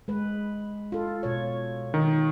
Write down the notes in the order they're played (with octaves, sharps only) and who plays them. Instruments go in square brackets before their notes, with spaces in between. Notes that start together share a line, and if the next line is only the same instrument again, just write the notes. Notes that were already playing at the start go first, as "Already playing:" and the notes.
[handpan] G#3 B4
F4 A4
B2 C#5
[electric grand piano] D#3